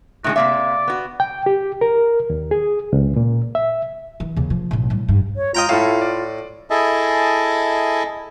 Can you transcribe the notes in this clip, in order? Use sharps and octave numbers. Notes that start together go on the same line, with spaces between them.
A2 D3 G#3 F#4
C3 A#3 D5 E5
B3 F#4
G5
G4
A#4
D#2
G#4
C#2
A#2
E5
E3
D#2 C#3
F3
B1 A2
A2 G3
G2
C#5
F4 D#5 G5 A#5
A2 E4 F4 A4 F5
D5
E4 G#4 A4 D#5 E5 A5